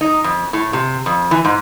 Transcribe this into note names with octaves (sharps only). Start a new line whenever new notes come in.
D#4
F2
A2
C3
F2
E3
G#2